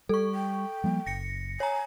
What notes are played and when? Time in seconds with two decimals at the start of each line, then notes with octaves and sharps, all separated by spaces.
0.09 G3 A4 C#6
0.35 G5
0.84 F3 G3 A#3
1.06 F#1 A#6 C#7
1.60 C#5 G#5 A#5